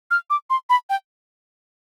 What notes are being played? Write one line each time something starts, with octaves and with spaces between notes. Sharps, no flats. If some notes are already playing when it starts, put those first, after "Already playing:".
F6
D6
C6
B5
G5